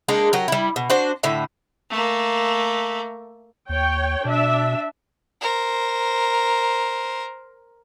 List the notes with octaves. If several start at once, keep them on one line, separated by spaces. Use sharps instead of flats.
G#3 A#3 D4 D#4
F#3 G4 A#4
G3 E4
B2
D4 F#4 C5
A2 D3 E5
A3 A#3
D#2 C#5 G5
B2 D4 E5
A#4 C5